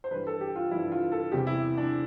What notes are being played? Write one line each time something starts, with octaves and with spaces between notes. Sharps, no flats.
C5
G2 E3 G3 B4
A4
G4
F4
G2 E3 G3 E4
F4
A4
E2 C3 G3 G4
E4
D4